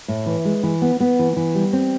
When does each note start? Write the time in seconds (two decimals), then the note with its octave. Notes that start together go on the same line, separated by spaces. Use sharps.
0.08 A2
0.26 E3
0.45 G#3
0.63 E3
0.82 B3
1.00 B3
1.19 E3
1.36 E3
1.55 G3
1.73 C4